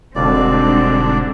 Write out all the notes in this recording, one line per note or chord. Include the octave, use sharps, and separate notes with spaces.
E1 G#2 D3 G3 C4 D4 D5